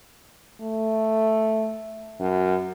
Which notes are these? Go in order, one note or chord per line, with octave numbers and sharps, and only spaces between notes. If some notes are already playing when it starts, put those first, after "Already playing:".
A3
F#2